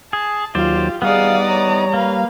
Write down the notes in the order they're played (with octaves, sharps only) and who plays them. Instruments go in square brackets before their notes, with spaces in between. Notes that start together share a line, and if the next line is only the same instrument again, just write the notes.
[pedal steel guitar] G#4 [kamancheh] A5
[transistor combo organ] D#2 F#3 [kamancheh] F4 G4 [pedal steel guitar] C5 D5
[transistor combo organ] G3 [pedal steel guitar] B3 D#4 [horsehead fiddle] G#4 F5 [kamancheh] D5 D#6
[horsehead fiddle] C#5 A#5
[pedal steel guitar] A#3 [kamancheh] B4 F5